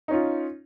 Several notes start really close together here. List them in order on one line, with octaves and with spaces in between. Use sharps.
D#4 C#4 F4